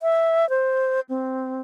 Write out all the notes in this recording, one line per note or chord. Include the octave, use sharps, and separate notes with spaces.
E5
C5
C4